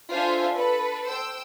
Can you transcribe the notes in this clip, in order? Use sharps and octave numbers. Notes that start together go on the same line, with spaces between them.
D4 F4 A4 C5 E5 G#5
A4 B4
C5 G5 E6